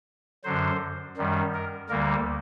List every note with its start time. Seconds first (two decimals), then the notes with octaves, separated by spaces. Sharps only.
0.44 F#2 D3 F#3 C5
1.17 F#2 D#3 G3
1.54 A#4
1.89 D2 D3 G3 A#3 A#4